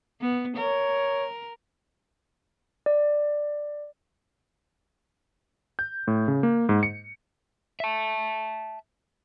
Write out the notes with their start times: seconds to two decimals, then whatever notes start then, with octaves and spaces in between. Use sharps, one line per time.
0.21 B3
0.57 A#4 C#5
2.86 D5
5.79 G6
6.08 A2
6.28 C#3
6.43 A#3
6.69 G#2
6.83 C#7
7.80 E5 A5